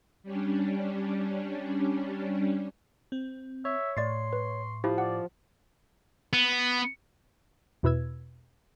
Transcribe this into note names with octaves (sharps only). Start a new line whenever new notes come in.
G3 C#4 D4
C4
C#5 E5
A2 D5 C6 C#6 A6 C7
B4
F3 E4 G4
D5 F#5
B3
E2 B2 E4 B4 E6 G#6